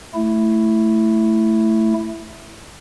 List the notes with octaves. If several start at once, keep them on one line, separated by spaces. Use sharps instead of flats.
A3 E4